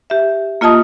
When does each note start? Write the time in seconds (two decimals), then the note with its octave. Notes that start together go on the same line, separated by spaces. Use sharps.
0.10 G4 E5
0.61 A#3 F4 D#5 A5 D#6